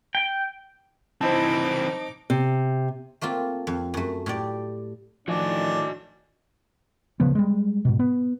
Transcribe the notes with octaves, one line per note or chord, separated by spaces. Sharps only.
G5
E3 C4 D#4 E4 C5 D#5 A5 D6
C3
A3 A#3 C4 F4
F2
F#2 A3
A2 G4 D5
A2 D#3 F3 D4 F#4 D#5 G#5
D1 C#3 F3 B3
G3 G#3
G#2 B2
B3